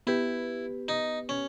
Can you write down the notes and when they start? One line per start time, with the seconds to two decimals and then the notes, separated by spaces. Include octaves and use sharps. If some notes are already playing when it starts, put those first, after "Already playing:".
0.07 B3 E4 G4 B4
0.88 D#4
1.29 C#4